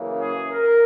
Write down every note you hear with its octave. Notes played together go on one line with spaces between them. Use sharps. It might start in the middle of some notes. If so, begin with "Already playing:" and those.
Already playing: F#2 C#3 E3 A#3
G#4
A#4